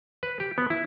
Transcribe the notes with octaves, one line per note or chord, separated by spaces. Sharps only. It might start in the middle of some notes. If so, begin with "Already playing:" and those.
B4
G4
B3
E4